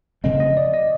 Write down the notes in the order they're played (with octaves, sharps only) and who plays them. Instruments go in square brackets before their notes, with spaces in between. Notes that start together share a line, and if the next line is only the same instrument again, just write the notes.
[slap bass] C#3 F3 A3 C4 [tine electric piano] D#5
[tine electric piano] D#5
D5
D#5